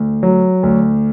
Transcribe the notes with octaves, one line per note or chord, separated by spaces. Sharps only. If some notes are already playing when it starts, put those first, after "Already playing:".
Already playing: D2
F#3
D2